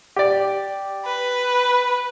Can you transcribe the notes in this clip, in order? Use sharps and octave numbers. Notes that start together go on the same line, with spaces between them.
G4 D5
B4